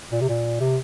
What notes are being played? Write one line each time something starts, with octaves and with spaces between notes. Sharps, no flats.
A#2
C3
A#2
C3